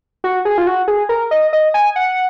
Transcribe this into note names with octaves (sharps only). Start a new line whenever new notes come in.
F#4
G#4
F4
F#4
G#4
A#4
D#5
D#5
G#5
F#5